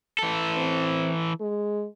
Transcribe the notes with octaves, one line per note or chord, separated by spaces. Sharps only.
E3 A4
C4
G#3